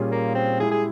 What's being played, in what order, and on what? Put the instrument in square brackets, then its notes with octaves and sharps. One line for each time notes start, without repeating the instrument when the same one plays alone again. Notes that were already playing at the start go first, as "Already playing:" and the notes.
Already playing: [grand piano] A#2 G3 C#4 F4 G#4
[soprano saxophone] A#3
C4
[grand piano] G#3 E4 G4 [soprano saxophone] G#4
[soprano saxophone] G#4